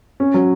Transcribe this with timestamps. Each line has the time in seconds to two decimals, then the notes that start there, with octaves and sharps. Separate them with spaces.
0.20 C#4
0.34 F#3